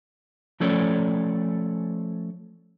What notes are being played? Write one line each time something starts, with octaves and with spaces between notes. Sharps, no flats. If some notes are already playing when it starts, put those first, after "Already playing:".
F3 A3 C#4 A4 C#5 D5